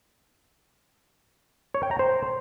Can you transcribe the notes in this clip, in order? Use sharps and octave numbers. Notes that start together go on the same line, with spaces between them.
C#5
G5
A#5
C5